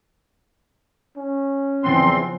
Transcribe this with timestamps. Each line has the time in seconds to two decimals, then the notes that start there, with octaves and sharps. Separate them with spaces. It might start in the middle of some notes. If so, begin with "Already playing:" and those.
1.16 C#4
1.84 E2 C#3 F3 B3 C4 C6